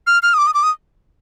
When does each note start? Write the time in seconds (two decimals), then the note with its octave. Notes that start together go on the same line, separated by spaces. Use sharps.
0.07 F6
0.23 F6
0.34 D#6
0.38 D6
0.47 D#6
0.54 D6
0.63 D#6